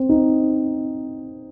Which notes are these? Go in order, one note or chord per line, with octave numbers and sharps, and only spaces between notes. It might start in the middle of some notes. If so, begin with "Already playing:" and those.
Already playing: C4
D#4